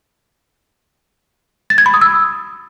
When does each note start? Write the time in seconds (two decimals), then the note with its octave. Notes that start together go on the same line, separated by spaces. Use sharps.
1.70 A6
1.78 G#6
1.86 B5
1.94 D#6
2.01 E6